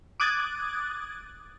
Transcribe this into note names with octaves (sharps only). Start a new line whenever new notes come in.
D6 D#6 F#6 G#6 A6